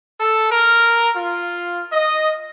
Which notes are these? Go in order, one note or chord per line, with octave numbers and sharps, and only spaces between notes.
A4
A#4
F4
D#5